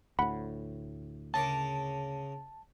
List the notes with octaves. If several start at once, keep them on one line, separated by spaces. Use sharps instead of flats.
D2 A2 F#5 B5
C#3 A#4 A5 D6